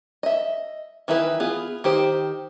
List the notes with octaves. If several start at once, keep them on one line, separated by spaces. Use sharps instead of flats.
D#5 E5
D#3 E3 E4 F#4 B4
B3 E4 F4 G#4
D#3 G4 C5